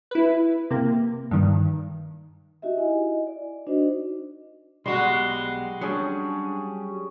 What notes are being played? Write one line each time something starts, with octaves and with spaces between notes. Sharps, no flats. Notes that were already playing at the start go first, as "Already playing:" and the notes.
E4 B4
C3 A#3
G2 D#3
D#4 F#4 G4 D#5 E5
E4 D#5 G#5
D5
D4 D#4 F#4 C5 D#5
B1 G3 G#3 F#4 C6
F#3 G3 C#4 D4 G#4